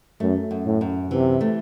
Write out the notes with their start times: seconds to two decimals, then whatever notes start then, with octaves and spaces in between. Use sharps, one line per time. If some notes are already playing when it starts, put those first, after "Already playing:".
0.20 F#2 A3
0.51 F#2
0.66 A2
0.81 F#2
1.11 C3 E3
1.41 A3